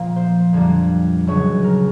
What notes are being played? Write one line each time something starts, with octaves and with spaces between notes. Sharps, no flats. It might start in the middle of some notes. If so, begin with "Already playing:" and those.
Already playing: A#2 F3 A#3
C5
F2 D3 G3 A#3
C#2 C#3 F#3 C#5
A#4